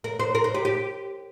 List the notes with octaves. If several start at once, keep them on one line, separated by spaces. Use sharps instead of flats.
A#4
C5
A#4
C5
G4
G4